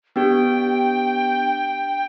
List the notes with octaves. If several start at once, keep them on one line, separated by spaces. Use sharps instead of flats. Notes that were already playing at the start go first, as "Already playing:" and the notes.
B3 D4 G4 G5